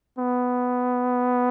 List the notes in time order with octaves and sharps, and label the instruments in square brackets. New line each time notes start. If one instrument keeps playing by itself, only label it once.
[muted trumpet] B3